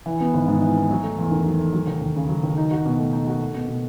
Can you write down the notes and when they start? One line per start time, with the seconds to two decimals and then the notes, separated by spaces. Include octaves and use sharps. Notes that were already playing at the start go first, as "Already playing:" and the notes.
0.06 E3
0.21 B3
0.34 G#1
0.48 G#2
0.62 E3
0.77 B3
0.91 F#3
1.03 A3
1.19 E2
1.31 D#3
1.46 F#3
1.59 A3
1.73 F#3
1.87 D#2
2.01 D#2
2.16 C#3
2.29 F#3
2.43 D#2
2.57 D#4
2.71 F#4
2.86 B2
2.99 A3
3.12 D#4
3.27 F#4
3.41 A3
3.54 B2
3.68 B2